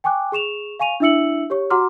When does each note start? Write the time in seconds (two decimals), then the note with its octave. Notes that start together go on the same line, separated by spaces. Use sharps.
0.04 G5 G#5 C#6 D6 F#6
0.32 G#4 C#6 E7 F7
0.80 F5 G#5 C#6 D#7 F7
1.00 D4 E4 E5 E6 C#7 F#7
1.50 G4 C#5 C#6
1.70 F#4 F#5 A#5 C6 D6 F6